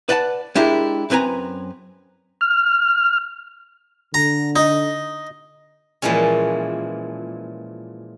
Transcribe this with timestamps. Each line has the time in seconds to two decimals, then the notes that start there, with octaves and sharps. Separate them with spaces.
0.09 B4 D5 F#5 A5
0.55 G#3 D4 E4 G4 A#4
1.10 F#2 C4 B4 G#5 A#5
2.41 F6
4.14 D3 A#5
4.56 D#4
6.02 A#2 E3 F3 G#3 C#4